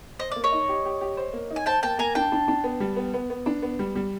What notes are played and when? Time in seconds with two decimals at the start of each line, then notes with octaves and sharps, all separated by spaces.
0.19 C5 D#5
0.32 A#3 D5
0.44 C#5 D#5
0.52 D#4
0.69 G4
0.85 G4
1.01 G4
1.17 C5
1.33 A#3
1.50 D#4
1.56 G#5
1.66 C5 G5 A5
1.83 A#3 G5 A5
1.98 A#3 G#5 A#5
2.15 D4 G5 A5
2.32 D4
2.48 D4
2.64 B3
2.80 G3
2.96 B3
3.14 B3
3.30 B3
3.46 D4
3.62 B3
3.79 G3
3.95 G3